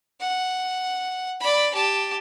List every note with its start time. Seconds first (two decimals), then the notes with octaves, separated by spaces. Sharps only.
0.21 F#5
1.40 D5 B5
1.74 G4 A5